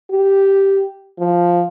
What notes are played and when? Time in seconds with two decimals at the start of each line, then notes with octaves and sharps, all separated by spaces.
0.11 G4
1.19 F3